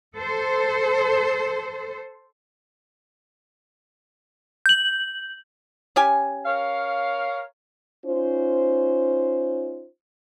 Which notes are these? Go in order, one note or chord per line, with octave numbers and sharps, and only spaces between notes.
A4 C5
G6 F#7
C#4 G4 G#5
A#4 C#5 F5
C#4 D#4 F4 C5